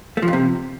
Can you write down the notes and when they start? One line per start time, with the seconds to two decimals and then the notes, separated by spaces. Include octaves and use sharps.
0.17 A3
0.22 F3
0.28 F2
0.33 C3